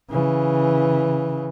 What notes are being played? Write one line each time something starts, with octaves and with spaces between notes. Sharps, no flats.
C#3 E3